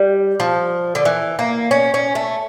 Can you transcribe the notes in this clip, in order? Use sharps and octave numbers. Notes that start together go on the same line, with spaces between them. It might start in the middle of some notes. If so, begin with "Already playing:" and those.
Already playing: G3
F3
D3
E3
A#3
C#4
C#4
A3